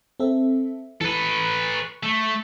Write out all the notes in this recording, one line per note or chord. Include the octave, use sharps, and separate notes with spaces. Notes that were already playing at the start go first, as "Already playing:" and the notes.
C4 A4 E5
E3 A4 B4 F#6
C#6
A3